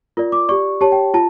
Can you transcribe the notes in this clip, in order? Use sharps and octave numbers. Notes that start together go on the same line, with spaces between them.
F4 A#4 D5
D6
G4 D5 C#6
G4 C#5 A5
G5
F4 A5